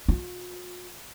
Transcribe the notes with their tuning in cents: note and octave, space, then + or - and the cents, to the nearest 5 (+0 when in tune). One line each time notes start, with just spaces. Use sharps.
F4 +45